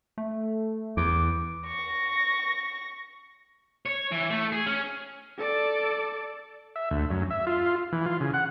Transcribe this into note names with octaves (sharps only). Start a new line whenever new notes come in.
A3
E2 D6
C#6 A#6
C#5
E3
A3
G#4
C#4
A4 D5
E5
D2
F#2
E5
F4
E3
F4
C#3
F#5